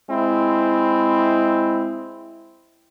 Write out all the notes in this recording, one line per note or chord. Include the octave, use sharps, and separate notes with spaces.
G#3 C4 E4